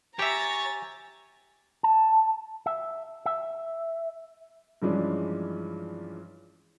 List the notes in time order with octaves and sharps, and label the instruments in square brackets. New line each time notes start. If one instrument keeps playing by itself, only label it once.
[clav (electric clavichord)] G4 E5 [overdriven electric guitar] C#5 [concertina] G#5 [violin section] A#5 A6
[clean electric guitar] A5
E5
E5
[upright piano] G2 E3 F3 G#3 C#4 D4